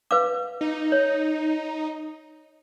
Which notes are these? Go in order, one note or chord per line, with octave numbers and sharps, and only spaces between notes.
B4 F5 D6
D#4
C#5